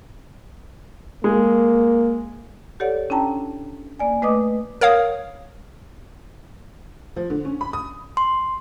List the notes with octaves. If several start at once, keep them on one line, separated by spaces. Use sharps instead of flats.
G#3 A#3
G4 A4 C#5 D5 F#5
C#4 D4 E4 G5 A5 A#5
A#3 D5 G#5
A3 B4 D#5 D6 D#6
A#4 C#5 F5 D#6
F3
D3
C#4
B5
D#6
C6